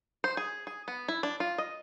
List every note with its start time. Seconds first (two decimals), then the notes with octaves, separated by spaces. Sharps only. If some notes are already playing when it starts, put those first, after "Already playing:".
0.24 C5
0.37 G#4
0.67 G#4
0.88 B3
1.08 E4
1.23 D4
1.40 F4
1.58 D#5